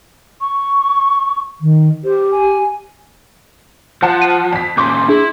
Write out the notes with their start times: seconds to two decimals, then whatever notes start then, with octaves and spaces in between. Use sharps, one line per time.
0.41 C#6
1.61 D#3
2.04 G4 C5
2.31 G#5
4.02 F3 C5 F#5 A5
4.22 D#7
4.53 F2 B6
4.77 A#2 C#3 C6 D6 G6
5.09 D4 E4 G#4